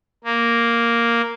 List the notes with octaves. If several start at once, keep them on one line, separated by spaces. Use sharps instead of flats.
A#3